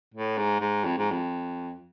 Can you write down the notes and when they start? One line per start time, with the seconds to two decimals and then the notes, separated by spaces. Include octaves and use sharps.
0.14 A2
0.38 G#2
0.61 G#2
0.85 F2
0.98 G#2
1.11 F2